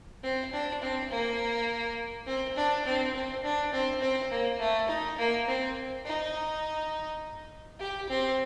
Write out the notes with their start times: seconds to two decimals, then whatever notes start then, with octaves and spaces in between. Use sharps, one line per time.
0.23 C4
0.52 D4
0.81 C4
1.10 A#3
2.26 C4
2.56 D4
2.85 C4
3.14 C4
3.44 D4
3.73 C4
4.01 C4
4.31 A#3
4.59 A3
4.88 D#4
5.18 A#3
5.47 C4
6.05 D#4
7.79 G4
8.09 C4